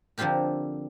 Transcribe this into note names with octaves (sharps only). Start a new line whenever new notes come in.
D3 F3 C4 F4 G4 A#4